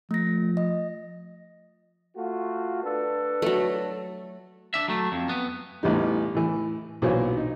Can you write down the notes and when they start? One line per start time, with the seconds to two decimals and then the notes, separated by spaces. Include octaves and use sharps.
0.11 F3 A3 A#6
0.57 D#5
2.15 A3 F4 F#4
2.83 D4 A4 B4
3.42 F#3 A3
4.74 D4 E5
4.88 F#3 A3
5.12 F2
5.29 B3
5.83 A1 E2 G3 D#4
6.35 A2 E3
7.02 B1 A#2 E3 F#4 C5 C#5
7.37 D#4